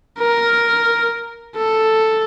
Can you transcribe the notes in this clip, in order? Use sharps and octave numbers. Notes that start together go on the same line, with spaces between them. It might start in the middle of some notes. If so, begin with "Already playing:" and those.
A#4
A4